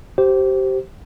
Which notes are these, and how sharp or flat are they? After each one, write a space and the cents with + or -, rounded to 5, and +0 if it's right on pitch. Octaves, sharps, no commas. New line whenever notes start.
G4 -25 C5 +0